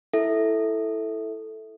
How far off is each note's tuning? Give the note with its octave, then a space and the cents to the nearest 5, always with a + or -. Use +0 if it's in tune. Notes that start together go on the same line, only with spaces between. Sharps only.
E4 +0 A4 +0 E5 -10